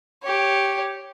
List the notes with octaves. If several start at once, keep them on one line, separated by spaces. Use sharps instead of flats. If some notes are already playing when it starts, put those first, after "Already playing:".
G4 C#5